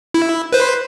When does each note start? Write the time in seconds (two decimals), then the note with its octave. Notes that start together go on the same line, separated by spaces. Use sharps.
0.14 E4
0.52 B4 C5